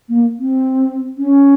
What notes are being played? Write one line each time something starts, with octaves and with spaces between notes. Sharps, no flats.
A#3
C4
C#4